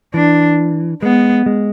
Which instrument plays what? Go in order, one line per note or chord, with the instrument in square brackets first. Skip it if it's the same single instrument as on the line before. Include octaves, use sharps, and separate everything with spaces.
[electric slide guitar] E3 [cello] D4
[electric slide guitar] G#3 [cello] B3
[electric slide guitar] G#3